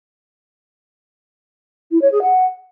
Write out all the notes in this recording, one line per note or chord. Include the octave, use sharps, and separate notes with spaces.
E4
C#5
G#4
F#5